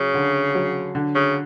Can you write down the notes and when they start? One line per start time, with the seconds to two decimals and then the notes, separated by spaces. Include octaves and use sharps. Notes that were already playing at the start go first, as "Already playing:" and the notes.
Already playing: C#3 F#3
0.14 D3
0.55 F#3
0.95 D3
1.15 C#3